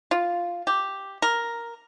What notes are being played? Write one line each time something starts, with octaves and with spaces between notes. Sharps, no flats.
F4
G4
A#4